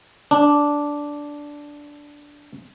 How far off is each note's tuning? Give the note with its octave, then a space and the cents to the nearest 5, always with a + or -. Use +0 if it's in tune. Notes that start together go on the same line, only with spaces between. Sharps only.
D4 -5